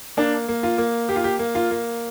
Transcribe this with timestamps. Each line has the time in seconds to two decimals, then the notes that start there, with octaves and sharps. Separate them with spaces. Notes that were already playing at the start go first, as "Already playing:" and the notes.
0.17 A#3 D4
0.48 A#3
0.63 F4
0.78 A#3
1.09 A#3 G4
1.16 F4
1.24 G4
1.39 A#3
1.55 F4
1.71 A#3